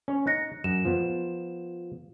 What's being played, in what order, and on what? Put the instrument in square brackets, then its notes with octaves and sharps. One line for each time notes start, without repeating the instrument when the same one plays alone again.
[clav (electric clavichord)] C#4 C#5
[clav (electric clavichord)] D#4 [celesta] F#6 A#6 C#7
[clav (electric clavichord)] F#2 [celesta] E7
[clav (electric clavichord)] F3 B3